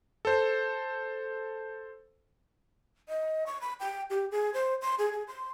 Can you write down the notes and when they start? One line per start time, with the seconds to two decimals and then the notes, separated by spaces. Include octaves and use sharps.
0.25 A4 C5
3.08 D#5
3.46 C#6
3.61 B5
3.80 G5
4.10 G4
4.31 G#4
4.54 C5
4.82 C6
4.99 G#4
5.12 G#4
5.28 C6